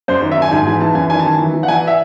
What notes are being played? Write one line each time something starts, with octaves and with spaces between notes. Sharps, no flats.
F#2 C5
D#3
E5
D#3 G#5
G#2 G#5
E3 G#5
E3 A5
F#2 G#5
D#3 G#5
A5
D#3 G#5
E3
E3
F#5
E3 G#5
F#5
E5